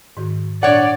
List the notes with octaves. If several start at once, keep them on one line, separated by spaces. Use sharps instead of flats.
G#2 D#3 F#4
A#2 D4 C#5 D5 F#5